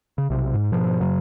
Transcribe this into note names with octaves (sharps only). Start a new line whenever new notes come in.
C#3
B1 C3
G#2
G#2 B2 F3
F#2 C#3 F#3